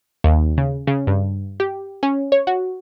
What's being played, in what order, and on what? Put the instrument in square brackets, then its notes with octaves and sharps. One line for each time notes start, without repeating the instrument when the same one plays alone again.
[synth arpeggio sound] D#2
C#3
C#3
G2
G4
C#4
C#5
F#4